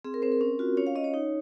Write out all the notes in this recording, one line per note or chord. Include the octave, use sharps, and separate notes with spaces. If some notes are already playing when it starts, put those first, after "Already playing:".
C4 G#4
A#4
C4 C5
A#4
C#4
F4 F#4
C#4 C#5
F5
C#4 D#5
C#5
D#4